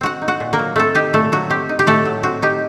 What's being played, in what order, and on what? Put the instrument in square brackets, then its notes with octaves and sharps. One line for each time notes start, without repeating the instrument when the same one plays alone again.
[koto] C4 F#4 F#5
D#4
F#4 F#5
A#2
A#3 A#4
F#3
A3 C4 A4
D#4 G4
A#2 A3 A4
F#3 F#4
C4 G4
D#4
G4
A2 A3 A4
F#3
C4 F#4
D#4 G4